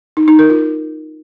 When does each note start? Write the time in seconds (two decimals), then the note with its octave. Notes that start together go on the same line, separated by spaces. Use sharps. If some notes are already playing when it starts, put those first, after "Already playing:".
0.17 D#4
0.28 D#4
0.39 A#4
0.50 F4